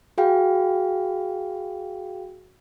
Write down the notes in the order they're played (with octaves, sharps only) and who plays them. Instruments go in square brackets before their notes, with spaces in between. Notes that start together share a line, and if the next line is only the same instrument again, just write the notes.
[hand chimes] F#4 G#4 F5 G5